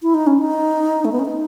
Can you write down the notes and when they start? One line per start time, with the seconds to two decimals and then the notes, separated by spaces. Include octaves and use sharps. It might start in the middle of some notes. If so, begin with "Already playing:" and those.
0.02 E4
0.14 D#4
0.27 C#4
0.39 D#4
1.05 A3
1.12 B3
1.19 C#4
1.25 D#4